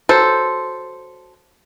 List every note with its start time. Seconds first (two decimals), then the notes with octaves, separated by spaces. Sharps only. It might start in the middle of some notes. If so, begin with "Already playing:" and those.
0.09 F#3 A4 C5